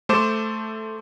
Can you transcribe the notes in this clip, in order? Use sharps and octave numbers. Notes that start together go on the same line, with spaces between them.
A3 A4 C5 D6 E7